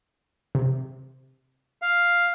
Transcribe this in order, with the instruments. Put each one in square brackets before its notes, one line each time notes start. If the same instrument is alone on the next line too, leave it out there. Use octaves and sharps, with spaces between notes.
[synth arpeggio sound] C3
[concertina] F5